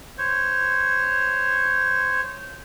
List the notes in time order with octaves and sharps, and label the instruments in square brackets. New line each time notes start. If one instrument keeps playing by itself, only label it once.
[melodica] C5 C#5